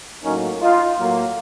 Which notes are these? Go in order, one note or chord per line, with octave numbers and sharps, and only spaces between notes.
A2 F#3 A#3 C#4 D#4
D#4 F4
A2 F#3 A#3